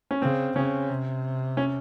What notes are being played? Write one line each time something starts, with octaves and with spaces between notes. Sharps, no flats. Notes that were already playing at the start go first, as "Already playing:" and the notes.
C#4
C#3 C4
C#3 C#4
C3
C#4